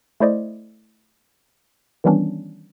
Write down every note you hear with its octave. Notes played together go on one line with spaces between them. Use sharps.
A3 E4 C5 D5 D#5
D#3 E3 G3 B3 C#4 D4